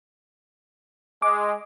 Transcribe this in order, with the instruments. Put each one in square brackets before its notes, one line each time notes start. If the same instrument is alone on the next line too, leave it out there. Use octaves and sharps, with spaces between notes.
[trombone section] G#3 [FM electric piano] D6